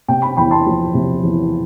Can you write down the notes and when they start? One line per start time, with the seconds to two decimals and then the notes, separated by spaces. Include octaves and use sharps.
0.08 C3 G5
0.22 G5 B5
0.37 E2 G5 B5
0.51 A5 C6
0.66 F3
0.94 C3
1.23 E2